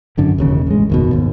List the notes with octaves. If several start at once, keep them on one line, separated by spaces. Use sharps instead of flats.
G#1 F#2 D3
E1 D#2 C#3
A1 G#3
F#1 D#2 B2
G#1 D#2